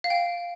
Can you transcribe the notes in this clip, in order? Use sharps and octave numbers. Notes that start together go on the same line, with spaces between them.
F5
G5